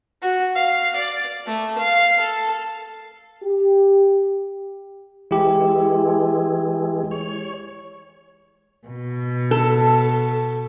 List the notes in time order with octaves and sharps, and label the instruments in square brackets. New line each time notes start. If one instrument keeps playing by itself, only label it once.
[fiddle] F#4
F5
D5
A3
F5
A4
[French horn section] G4
[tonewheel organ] E3 G#3 [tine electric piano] E4 G4
[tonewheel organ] C#5
[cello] B2
[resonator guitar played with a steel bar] A4